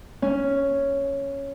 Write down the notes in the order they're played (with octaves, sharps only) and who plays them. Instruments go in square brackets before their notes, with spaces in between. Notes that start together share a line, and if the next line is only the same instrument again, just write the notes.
[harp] C#4